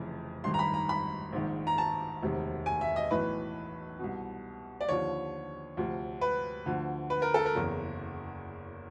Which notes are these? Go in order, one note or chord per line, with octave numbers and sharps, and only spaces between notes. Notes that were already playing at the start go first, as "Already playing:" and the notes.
Already playing: F1 F2 C#3 E3
G#1 G2 D#3 C6
A#5
B5
A#5
B5
A#1 G#2 D#3
A#5
A5
E1 D2 C3 D#3
G#5
E5
D#5
B1 A2 E3 B4
C2 B2
D5
D#2 D3 F3 C#5
D2 C3 F3
B4
D2 D3 F3
B4
A#4
A4
A#4
F#1 E2 C#3